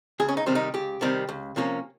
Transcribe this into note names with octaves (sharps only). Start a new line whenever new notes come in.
C#2 G#4
C#4
D#4
C3 D#3 G3 C4
D#4
C#2 G4
C3 D#3 G3 C4
C#2
C3 F3 A#3 C#4